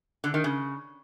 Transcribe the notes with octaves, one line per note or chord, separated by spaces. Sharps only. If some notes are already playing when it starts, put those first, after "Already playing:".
D3
D#3
C#3